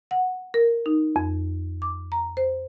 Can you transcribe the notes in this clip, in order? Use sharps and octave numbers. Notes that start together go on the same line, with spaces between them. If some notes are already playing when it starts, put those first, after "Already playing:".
F#5
A#4
D#4
F2
D6
A#5
C5